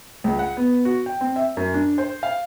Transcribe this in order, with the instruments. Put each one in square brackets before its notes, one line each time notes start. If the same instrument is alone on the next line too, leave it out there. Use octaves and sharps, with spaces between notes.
[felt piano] C#2
F#5
B3
F#4
G5
C4
E5
F#2
D4
C5
F5